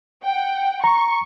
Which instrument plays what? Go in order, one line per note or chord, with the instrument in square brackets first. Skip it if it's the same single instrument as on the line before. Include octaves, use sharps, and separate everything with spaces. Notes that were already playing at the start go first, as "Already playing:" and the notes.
[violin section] F#5 G5
[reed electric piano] A#5 [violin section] C#6